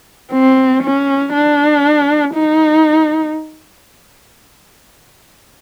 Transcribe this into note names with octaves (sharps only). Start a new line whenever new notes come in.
C4
C#4
D4
D#4